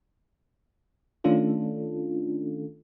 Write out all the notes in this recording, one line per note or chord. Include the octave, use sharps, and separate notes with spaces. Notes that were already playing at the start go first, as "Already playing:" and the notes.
D#3 A3 C#4 D4 F4 A4